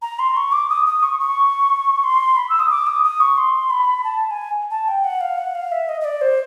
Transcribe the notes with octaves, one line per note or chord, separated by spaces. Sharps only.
A#5
C6
C#6
D6
D#6
D#6
C#6
C#6
C6
B5
E6
D#6
D6
D#6
D#6
C#6
C6
B5
A5
A5
G#5
A5
G5
F#5
F5
F#5
F5
E5
D#5
D#5
D5
C5